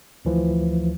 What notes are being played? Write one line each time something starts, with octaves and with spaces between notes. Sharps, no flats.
D2 E3 F3